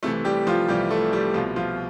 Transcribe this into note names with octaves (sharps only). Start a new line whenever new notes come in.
C2 C3 E3 A3 A4
G3 G4
F3 F4
C2 C3 E3 G3 G4
A3 A4
G3 G4
C2 B2 F3 F4
F3 F4